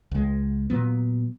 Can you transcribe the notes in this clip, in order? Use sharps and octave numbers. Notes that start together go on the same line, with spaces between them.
C#2 G#3
A#2 F#3 B3